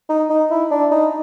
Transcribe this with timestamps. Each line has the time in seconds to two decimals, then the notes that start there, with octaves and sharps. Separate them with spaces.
0.09 D#4
0.30 D#4
0.51 E4
0.71 D4
0.91 D#4